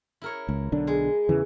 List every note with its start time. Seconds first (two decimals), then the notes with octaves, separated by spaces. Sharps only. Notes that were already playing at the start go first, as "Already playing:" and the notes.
0.22 E4 A#4 C#5
0.49 C#2
0.72 B1 D3 D4
0.87 G#3
1.29 E2 C#3 E3